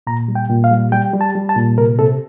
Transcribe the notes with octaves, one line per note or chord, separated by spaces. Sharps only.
A#2 A#5
G3
G5
A#2
F5
G3
G3 G5
G3
A5
G3
A5
A#2
C3 A#4
C3 A4